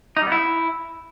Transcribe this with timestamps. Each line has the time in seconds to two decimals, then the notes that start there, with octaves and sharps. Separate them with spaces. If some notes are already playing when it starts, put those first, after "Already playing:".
0.17 D#4
0.22 G3
0.27 B3
0.32 E4